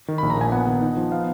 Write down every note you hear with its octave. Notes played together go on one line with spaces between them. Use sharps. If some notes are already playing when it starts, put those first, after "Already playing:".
D#3
A#1 B5
A#5
A#2 G#5
B3 F#5
D#3
D#4
F3
B3 F5